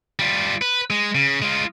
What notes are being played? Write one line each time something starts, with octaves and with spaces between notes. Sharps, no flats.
G3 F4
B4
G#3
C#3
G#3 F4